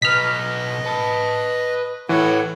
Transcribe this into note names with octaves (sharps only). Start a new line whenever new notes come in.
B1 B4 D#5 F6 B6
B4 A5
A2 E3 A4 B4 C#5 F#5